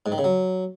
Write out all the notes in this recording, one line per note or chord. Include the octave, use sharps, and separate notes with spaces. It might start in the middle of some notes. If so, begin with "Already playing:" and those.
G#2
D#3
C#3
F#3